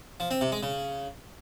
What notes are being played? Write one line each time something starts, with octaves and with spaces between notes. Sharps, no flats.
F3
C4
C3
G#3
C#3